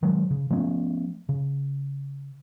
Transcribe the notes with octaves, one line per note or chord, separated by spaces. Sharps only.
D#3 F#3 G#3
C#3
F3 A3 B3 C#4
C#3